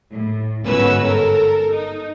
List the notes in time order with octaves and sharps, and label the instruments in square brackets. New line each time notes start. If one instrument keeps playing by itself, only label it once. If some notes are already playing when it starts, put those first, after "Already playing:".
[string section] A2
G1 G#2 C#4 F#4 B4 E6
A4 A#4
D#4